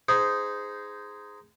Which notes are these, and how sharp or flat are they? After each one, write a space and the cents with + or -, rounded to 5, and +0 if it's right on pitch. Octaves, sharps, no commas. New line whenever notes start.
D#4 +0 G#4 +0 C5 -20